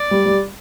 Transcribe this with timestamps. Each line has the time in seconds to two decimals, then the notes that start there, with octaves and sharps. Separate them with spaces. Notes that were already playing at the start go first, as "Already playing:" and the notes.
Already playing: D5
0.11 G3
0.26 G3